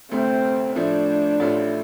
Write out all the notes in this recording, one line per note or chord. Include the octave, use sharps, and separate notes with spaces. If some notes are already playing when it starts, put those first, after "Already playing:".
D2 C3 A3 C4
A2 F3 A3 D4
A1 A2 A3 F4